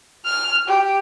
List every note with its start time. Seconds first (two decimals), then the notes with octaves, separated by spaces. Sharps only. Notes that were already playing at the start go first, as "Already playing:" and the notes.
0.25 F6
0.67 G4